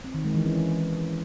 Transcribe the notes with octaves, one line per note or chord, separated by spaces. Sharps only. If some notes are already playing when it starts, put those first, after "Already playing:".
C4
D#3
G#3
E3
C#4